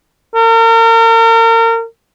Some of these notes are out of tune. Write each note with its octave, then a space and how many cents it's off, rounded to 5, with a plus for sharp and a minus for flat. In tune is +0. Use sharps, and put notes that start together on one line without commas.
A#4 -35